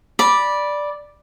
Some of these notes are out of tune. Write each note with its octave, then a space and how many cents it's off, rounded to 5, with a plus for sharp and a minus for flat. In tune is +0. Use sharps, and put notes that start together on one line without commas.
D5 +0 B5 -15 D6 +0